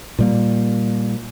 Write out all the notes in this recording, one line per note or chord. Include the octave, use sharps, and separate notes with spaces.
A#2 G3 A#3